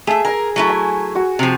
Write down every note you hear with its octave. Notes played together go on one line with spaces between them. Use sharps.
A3 G#4 E5
A#4 G#5 A#5
F#3 A3 E4
G#5
F#4
C3 F3